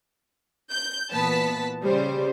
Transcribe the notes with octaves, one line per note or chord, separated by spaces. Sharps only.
G6
A#2 E3 B3 B4 A5 B6
C#3 G3 C5